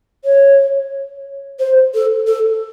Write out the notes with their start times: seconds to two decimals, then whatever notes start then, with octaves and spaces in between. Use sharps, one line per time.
0.25 C#5
1.59 C5
1.94 A4
2.27 A4